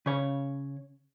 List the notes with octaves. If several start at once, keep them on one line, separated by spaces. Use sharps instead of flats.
C#3 C#5